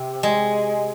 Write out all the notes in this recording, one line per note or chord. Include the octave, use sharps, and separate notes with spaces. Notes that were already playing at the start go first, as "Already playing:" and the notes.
Already playing: C3
G#3